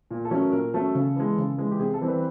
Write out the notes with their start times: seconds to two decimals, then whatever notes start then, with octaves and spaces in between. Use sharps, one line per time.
0.11 A#2
0.25 A4
0.31 F#3 A3 C#4
0.38 A#4
0.52 A#2 A#4
0.74 F#3 A3 C#4 A4
0.95 C#3
1.16 E3 G#3
1.38 C#3
1.58 E3 G#3
1.71 G4
1.79 C3 G#4
1.93 A4
2.01 E3 G3 C4
2.08 B4